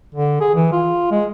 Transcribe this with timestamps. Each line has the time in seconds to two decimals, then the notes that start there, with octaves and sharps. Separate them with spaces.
0.14 D3
0.41 G#4
0.55 E3
0.72 F4
1.11 G#3